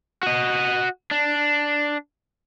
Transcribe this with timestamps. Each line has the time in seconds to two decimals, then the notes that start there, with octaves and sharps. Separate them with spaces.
0.23 F#4 D#5
1.11 D4